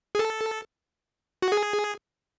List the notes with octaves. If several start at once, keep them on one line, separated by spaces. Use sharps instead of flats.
G#4
A4
F#4
G#4